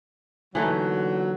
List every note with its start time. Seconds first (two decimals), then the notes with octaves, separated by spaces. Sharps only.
0.55 A#2 D3 E3 F#3 A3 D#4